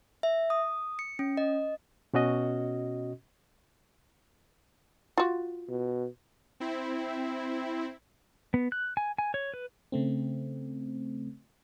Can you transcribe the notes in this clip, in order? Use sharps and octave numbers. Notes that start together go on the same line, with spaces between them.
E5
D#6
C#7
C#4
D#5
B2 C#4 F#4 D#5
F4 F#4
B2
C4 E4
B3
F#6
G#5
G#5
C#5
B4
C#3 A3 C4